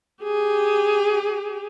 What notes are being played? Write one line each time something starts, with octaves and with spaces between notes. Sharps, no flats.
G4 G#4